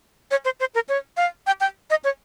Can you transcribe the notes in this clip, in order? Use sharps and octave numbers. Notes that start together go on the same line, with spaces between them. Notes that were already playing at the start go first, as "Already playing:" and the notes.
C#5
C5
C5
A#4
C#5
F5
G5
G5
D#5
C#5